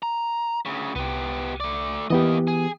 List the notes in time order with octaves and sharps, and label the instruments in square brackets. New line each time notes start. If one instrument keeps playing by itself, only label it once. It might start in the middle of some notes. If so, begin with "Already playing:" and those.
[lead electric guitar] A#5
D2 C#3
[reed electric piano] C2 [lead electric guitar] B3 G4
[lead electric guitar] A3 D5
[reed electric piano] E3 B3 G4 [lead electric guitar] A#3 D#5
[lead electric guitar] G#4